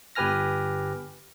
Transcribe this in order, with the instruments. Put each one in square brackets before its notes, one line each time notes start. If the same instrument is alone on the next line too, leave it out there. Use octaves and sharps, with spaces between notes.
[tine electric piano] G1 G4 B4 G#5 F6 A#6